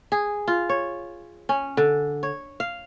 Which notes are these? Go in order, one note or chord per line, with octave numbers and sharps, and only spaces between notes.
G#4
F4
C#5
C#4
D3
C#5
F5